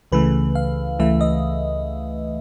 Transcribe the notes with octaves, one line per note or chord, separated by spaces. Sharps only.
C#2 C#3 E3 A3 B4
F5
C#2 C#3 E3 A3 E5
D#5